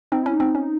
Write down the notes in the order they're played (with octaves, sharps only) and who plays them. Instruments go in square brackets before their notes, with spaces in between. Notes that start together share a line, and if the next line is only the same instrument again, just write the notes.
[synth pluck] C4 [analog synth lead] D#4
[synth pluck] C#4 [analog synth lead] E4
[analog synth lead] D#4
[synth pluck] C4
C#4